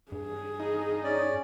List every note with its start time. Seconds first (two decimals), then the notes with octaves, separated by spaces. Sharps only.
0.12 G2 G#4
0.60 D#4
1.04 C#4 D5